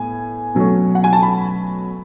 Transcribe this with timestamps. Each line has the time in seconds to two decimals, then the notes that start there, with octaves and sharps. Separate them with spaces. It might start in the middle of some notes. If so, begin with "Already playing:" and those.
Already playing: A2 B3 G#5
0.55 B2 F#3 A3 C#4
0.95 F#5
1.04 G#5
1.13 A5
1.22 B5